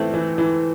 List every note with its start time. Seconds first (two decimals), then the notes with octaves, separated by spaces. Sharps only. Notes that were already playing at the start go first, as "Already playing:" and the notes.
Already playing: E3 A3 C4
0.14 E3
0.38 E3